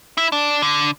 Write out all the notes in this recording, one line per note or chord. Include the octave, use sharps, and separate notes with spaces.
E4
D4
D3